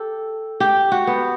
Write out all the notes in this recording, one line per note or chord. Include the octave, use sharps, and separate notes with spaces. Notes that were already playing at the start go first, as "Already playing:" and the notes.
Already playing: G4 A4
G4
F#4
B3